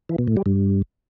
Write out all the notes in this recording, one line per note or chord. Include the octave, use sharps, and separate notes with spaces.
E3
B2
A2
G3
G2